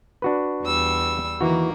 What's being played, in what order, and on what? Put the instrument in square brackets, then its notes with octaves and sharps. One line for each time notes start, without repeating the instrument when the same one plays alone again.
[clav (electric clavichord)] D4 F#4 B4
[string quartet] E2 G3 E6
[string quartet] D#3 A#3 [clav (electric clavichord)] E3 F#4